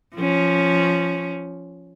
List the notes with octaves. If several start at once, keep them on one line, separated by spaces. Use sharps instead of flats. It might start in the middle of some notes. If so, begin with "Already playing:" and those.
F3 C#4